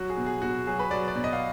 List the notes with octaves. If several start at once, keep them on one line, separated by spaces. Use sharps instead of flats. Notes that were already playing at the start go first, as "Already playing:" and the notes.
Already playing: F#3 F#4
G#4
B2
G#4
B2 F#4
F#3 G#4
B4
F#3 D5
D5
B2
D#5
F5